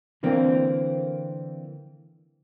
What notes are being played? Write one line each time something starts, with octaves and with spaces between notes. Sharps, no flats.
D3 E3 A#3 C4